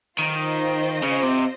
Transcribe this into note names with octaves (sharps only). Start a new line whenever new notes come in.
D#3 F4 C5 D#5
C#3
C3